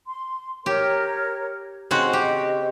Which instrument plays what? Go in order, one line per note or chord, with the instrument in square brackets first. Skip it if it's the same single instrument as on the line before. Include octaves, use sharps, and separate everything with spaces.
[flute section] C6
[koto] G4 [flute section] A#4 C#5
[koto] C#3 C4 F#4 [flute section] C5 D#5 C#6
[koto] G4